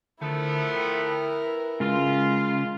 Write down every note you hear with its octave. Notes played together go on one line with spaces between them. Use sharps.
D3 F3 A3 B3 E4 A#4
G5
B4
C#3 G#3 F4